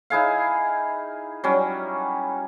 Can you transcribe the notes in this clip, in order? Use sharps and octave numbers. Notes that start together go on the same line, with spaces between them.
D#4 E4 G#4 F5
F#3 G3 C#4